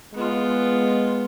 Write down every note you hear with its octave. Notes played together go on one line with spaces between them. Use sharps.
G#3 B3 F4